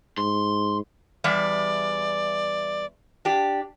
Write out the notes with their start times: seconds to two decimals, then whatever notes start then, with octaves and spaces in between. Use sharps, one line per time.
0.18 G#2 C6
1.24 E2 G3 D5 E5
3.25 D4 G4